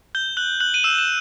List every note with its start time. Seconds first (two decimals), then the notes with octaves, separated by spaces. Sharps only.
0.15 G6 G7
0.37 F#6 F#7
0.60 F#6 F#7
0.74 D#7
0.84 E6 E7
0.98 E7